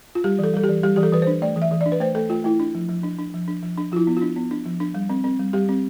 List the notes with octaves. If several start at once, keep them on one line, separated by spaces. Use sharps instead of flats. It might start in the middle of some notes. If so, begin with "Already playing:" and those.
F4
G3 G4
E3 A4
G3 A4
G4
E3
G3 G4
E3 G4
A4
E3 B4
C5
D4
A3 D5
E3
E5
E3
D5
D4
B4
A3 C5
A3 A4
A3 F4
A3 E4
D4
F3
F3
D4
D4
F3
D4
F3
D4
F3 E4 F4
B3
D4 F4
B3
D4
F3
D4
G3
C4
C4
G3
G3 G4
C4